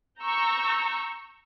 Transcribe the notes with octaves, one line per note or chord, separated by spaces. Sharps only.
A#5 C#6 E6 G6